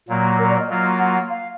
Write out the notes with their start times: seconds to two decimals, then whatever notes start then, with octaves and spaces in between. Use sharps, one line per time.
0.09 A#2 F#3 A#3
0.39 A#4
0.49 D5
0.60 D#5
0.69 F#3 A#3 F4
0.99 F#5
1.14 F#5
1.30 F5